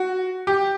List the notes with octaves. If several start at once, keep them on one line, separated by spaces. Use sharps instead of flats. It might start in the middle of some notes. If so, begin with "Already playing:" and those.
Already playing: F#4
G4